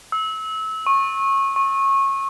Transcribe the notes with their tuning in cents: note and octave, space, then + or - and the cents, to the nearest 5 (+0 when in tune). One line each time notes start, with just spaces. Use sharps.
E6 -25
C#6 -25
C#6 -25